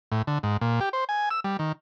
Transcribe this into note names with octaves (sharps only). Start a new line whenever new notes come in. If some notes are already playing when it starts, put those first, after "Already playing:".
A2
D3
G#2
A#2
G4
C5
G#5
E6
G3
D#3